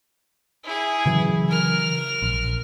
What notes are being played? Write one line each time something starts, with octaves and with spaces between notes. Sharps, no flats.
E4 G#4
C#3 E3 F#3
A#4 F6
A#1